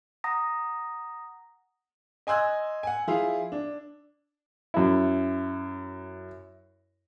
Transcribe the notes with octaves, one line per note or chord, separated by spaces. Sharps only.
F#5 A#5 D#6 A#6
D#5 G#5 C6 E6 F#6 G#6
F#5 G#5
F3 E4 F4 G#4 F5
D4
F#2 E4